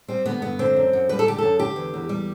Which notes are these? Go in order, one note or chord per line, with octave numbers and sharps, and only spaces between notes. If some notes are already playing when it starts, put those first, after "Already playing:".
G3 C4
D3 B3
G2 B3
D3 C4
F#2
F#2
G3 B4
A4
D3 G4
F#2 A4
D3 G4
E2
E2
G3